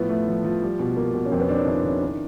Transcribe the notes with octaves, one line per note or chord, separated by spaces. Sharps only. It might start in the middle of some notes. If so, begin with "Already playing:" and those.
Already playing: A2 F3 B3
A3
F3
F3
G3
B2
A#3
B2
C#4
F2 A#3 C4
B3 C#4
F2 C4 D4
C#4 D#4
C#3 D4 E4
C#3
D#3